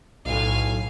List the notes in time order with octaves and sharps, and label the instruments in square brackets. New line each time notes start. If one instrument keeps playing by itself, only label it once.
[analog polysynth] B1 A2 [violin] F5 G#5